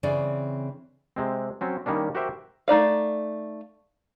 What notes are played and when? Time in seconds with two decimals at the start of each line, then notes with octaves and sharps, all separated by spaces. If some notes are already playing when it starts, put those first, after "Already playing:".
0.03 C#3 E3 C4 D5
1.16 C3 G#3 C4
1.61 F#3 C4 C#4
1.86 D#3 G3 A#3 C#4 D4
2.15 F#4 G4 A#4 C5 E5 G5
2.68 A3 D#4 D5 F5